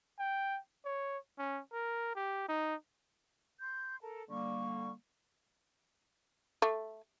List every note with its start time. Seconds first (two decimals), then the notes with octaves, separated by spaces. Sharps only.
0.19 G5
0.86 C#5
1.39 C#4
1.73 A#4
2.16 G4
2.49 D#4
3.60 C6 G6
4.02 A4 A#4 A5
4.29 D3 G3 A#3 C#6
6.62 A3